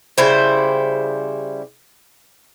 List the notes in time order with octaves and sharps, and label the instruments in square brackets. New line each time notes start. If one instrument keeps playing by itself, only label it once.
[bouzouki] C#3 G3 E4 C5